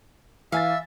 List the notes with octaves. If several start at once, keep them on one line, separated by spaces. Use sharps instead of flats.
E3 E5 F5 G#5 A6